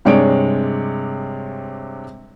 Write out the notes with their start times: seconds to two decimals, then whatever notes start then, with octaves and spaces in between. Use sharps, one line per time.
0.05 G2 C3 G#3 C#5 D5 D7